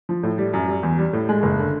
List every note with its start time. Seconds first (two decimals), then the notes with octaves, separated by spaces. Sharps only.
0.09 F3
0.23 A2
0.38 G3
0.54 F#2
0.68 G3
0.83 E2
0.98 G3
1.13 A2
1.29 G#3
1.43 F#1
1.59 D3